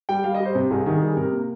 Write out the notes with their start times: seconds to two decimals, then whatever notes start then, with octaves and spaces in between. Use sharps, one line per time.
0.09 G3 G5
0.24 G3 F5
0.34 D#5
0.40 G3
0.45 C5
0.55 C3
0.71 C2 G#4
0.86 D#3 G#4
1.01 G3 G#4
1.16 C3 A#4
1.33 A#3